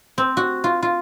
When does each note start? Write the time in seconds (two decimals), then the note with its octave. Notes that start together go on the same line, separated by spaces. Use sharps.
0.18 C4
0.37 F#4
0.64 F4
0.83 F4